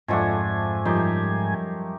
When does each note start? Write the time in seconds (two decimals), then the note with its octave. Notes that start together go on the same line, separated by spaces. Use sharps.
0.08 F2 G#2 F3 A3 D4 D#5 F#5 G#5
0.85 F#2 F3 G3 D#4 G4 C6